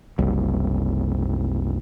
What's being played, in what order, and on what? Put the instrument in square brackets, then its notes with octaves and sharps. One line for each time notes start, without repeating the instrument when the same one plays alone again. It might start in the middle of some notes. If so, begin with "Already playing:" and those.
[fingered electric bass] F#1 C2